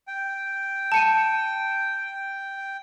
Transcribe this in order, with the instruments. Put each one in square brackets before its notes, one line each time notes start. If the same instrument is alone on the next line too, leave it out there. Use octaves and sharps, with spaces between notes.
[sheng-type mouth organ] G5
[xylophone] A5 C#7 D#7